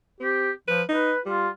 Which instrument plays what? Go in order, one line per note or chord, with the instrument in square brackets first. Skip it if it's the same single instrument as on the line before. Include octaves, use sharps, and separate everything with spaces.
[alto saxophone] C4 [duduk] G4
[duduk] F3 [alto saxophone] B4
[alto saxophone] D#4 [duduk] B4
[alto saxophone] G3 [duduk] F4